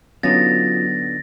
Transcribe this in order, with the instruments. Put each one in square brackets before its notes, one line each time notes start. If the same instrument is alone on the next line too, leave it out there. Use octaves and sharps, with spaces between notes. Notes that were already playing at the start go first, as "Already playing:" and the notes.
[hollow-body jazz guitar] D3 B3 D#4 [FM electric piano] F#3 C#4 F4 [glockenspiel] A6 A#6